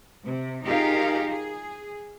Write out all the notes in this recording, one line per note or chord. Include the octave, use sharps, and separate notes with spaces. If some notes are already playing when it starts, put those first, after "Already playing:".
C3
D#4 F4 G4 G#4 A#4 F5
G#4